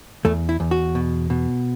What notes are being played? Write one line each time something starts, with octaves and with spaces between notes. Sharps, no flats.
E2 A3
E4
E2
F#4
B2
B2